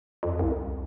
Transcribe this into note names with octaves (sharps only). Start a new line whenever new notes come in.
F2
C2